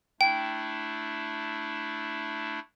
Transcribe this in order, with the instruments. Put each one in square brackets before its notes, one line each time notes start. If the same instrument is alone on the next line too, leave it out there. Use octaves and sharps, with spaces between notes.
[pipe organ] A3 D4 E4 [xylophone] G5